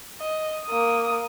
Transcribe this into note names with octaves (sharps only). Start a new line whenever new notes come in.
D#5
A#3 D#6